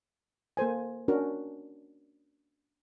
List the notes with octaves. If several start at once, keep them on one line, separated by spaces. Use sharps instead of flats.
A#3 A4 C5 G#5
C#4 D4 F#4 A#4